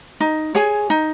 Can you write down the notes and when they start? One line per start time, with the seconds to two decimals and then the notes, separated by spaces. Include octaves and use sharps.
0.20 D#4
0.55 G#4 C#5 G#5
0.90 D#4